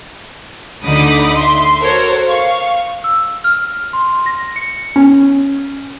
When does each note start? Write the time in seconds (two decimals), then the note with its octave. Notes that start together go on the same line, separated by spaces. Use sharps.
0.85 D2 D3 D#4 B5 D6 D#6
1.36 E5 C6
1.81 F#4 A4 A#4 C5 C#5 A#5
2.29 F5 C#6
3.04 E6
3.44 F6
3.93 C6
4.26 A#6
4.56 C#7
4.96 C#4